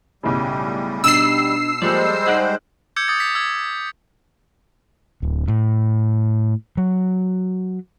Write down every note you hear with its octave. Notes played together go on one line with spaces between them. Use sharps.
B1 A2 C#3 G3
B2 D4 D#4 E6 C7 F#7
F3 G3 G#3 A#3 A4 C5 D5
D#4 G#4 F#5 F#6 D7
D6 E6 G6 G#6 C#7
D6 D#6 A6
B6
E6 G#6
D1
A2
F#3